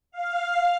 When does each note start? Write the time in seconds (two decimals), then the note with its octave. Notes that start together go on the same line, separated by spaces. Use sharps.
0.11 F5